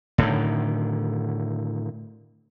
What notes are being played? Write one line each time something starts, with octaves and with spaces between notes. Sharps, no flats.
A2 D3 D#3